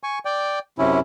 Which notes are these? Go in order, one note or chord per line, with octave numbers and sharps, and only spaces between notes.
G#5 C#6
D5 G5
F#2 C3 C#4 E4